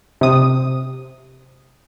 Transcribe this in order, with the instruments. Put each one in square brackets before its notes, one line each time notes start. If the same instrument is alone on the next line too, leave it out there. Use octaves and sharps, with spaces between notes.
[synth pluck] C3 D#6